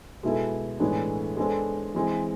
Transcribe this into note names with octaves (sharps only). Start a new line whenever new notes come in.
B2 G#3 B3 E4 A4
A2 E3 G#3 B3 D4
G#3 B3 D4 A4 C5
E3 G#3 C4